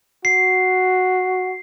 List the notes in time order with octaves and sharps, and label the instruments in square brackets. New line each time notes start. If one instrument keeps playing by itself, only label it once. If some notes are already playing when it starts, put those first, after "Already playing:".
[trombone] F#4 [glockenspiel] C7